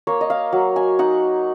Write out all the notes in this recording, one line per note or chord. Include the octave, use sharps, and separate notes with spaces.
A#3 C#5
D#5
F5
F#3
G#5
D#4 F#5